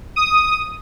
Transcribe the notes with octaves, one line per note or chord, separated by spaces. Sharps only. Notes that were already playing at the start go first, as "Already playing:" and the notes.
D#6